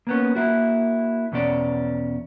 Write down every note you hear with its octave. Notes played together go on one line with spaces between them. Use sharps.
A#3 B3 C#4
A#3 E4 F#4
E2 B2 C#4 D5